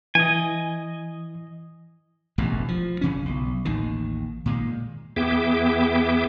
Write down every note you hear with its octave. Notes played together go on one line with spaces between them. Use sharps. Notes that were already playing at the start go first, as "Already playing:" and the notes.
E3 D#5 G#5
E1 A1 E2 G2
F3
F#1 C#3 C#4
B1
A1 D#2 D#3
A#2 D#3 G#3
E2 B3 G#4 E5 G5 D6